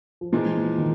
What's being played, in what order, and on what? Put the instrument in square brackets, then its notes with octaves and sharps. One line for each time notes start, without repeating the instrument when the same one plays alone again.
[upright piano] F3
[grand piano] A#2 F3 G#3 [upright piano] E3
[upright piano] D#3